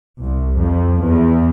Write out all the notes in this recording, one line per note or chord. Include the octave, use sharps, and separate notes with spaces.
C2
F2
E2